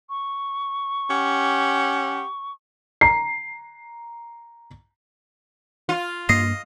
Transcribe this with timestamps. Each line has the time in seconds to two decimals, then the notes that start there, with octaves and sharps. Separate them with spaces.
0.09 C#6
1.11 C#4 G4 F#5
3.01 A#5 C7
5.89 F4
6.29 G2 A#3 D#5 C7